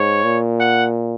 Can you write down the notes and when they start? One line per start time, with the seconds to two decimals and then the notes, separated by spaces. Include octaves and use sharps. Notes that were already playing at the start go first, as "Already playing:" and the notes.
Already playing: G#2 C#5
0.24 A#2
0.60 F#5